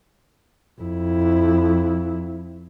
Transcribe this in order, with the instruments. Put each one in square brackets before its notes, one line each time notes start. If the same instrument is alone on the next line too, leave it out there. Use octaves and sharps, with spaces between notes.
[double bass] F2 E4